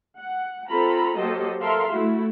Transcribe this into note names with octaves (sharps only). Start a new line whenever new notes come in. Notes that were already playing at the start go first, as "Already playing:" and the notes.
F#5
C4 F4 A4 A#5 B5
F#3 A#3 G4 A4 C5 D#5
A4 A#4 E5 F5 C6
A3 E4 F#4